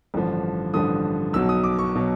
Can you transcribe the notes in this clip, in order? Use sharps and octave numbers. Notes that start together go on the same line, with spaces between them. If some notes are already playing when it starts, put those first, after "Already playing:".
A1 G2 D3 F3
A1 G2 D3 F3 D#6
B1 B2 F#3 E6
D#6
D6
C#6
B2 F#3